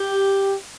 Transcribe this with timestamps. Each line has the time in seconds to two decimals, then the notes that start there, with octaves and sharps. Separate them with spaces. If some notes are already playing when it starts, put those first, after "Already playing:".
Already playing: G4